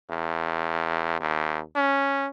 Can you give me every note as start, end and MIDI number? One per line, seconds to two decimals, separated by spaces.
0.10 1.17 40
1.20 1.61 39
1.76 2.27 61